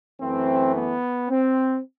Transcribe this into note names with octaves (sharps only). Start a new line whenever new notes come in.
F#2 E3 A3 C4
B3
C4